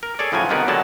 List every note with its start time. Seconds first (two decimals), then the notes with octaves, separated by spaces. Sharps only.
0.03 A#4
0.19 G#4 A4 C#5 D5
0.32 A2 C#3 F3 F#3 G#5
0.49 C2 D3 D#3 B3 D#4 D5
0.68 D3 F#3 G#3 A5